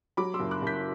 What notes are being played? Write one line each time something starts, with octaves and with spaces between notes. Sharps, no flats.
F#3 B5 D6
C6 E6
F#1
D6 F#6
F#1 G6 B6